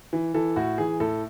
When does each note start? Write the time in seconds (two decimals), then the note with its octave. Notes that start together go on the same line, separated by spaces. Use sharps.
0.13 E3
0.34 E3 A4
0.56 A2 F#4
0.78 E3 G#4
1.00 A2 A4